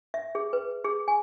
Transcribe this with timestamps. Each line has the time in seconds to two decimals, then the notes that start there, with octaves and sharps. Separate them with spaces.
0.14 E5
0.35 G#4
0.53 B4
0.85 G#4
1.08 G#5